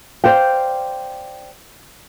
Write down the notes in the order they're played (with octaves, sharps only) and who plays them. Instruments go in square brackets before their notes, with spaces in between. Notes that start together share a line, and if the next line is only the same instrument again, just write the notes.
[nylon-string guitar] C5 D5 F5 G5